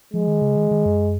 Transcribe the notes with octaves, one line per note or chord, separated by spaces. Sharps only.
F3 G#3
D#3
C#3
D#3
D#3
F#2